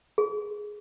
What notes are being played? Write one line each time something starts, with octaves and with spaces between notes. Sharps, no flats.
G#4